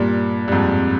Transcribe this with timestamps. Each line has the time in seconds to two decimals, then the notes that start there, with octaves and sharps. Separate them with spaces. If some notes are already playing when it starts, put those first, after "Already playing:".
Already playing: G2 A#2
0.48 G2
0.52 F2 G#2